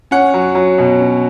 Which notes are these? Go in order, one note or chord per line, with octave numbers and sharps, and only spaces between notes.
C#4 F#5
F#3
F#3
B2
C#4